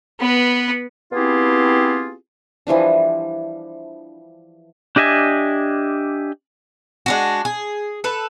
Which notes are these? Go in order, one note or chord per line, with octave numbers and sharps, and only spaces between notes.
B3 B4
B3 C4 E4 F4 G4 G#4
E3 F3 G3 D4
D4 G4 D#5 E5 G#5
G#3 D4 F#4
G#4
A4 B4